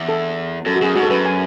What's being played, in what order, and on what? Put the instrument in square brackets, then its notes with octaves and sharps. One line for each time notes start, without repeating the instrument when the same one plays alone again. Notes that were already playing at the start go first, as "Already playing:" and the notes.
Already playing: [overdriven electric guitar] E2
[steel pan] A4
[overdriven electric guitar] F#2 [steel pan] A4
[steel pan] F#4
[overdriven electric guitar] F#2 [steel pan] G#4
[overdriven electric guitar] G#2 [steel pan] F#4
[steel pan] A4
[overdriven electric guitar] F#2 [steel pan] B4
[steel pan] G#5